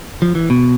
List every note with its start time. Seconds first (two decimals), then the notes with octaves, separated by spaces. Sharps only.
0.22 F3
0.35 E3
0.50 B2